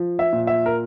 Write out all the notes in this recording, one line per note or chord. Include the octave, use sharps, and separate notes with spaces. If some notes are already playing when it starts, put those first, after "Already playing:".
Already playing: F3
E5
A#2
E5
A#4